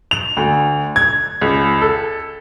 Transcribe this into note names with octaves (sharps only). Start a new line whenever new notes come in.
F7
D2
G#6
C#2
A4